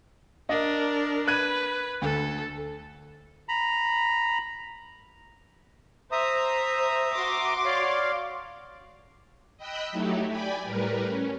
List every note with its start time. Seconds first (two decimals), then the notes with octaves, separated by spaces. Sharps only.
0.49 D4 A#4 D#5
1.28 B4 F#6 G#6 D#7
2.02 D2 A4
3.49 A#5 B5
6.12 C5 E5 A#5 D#6
7.14 F#4 C6 D6
7.65 C#5 D5 F5
9.57 D#5 G5 B5 E6 F#6 G6
9.92 F#3 A3 D#4 E4 G4
10.28 D5 G5 G#5 B5
10.64 A2 G3 A#4 B4
11.04 C#4